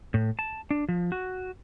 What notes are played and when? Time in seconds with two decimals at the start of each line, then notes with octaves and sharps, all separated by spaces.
0.14 A2
0.39 A5
0.71 D4
0.89 F3
1.12 F#4